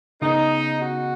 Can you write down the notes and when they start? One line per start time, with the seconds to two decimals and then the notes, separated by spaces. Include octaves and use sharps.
0.21 C#3 B3 D#4 G#4 B4 D#5
0.80 F#4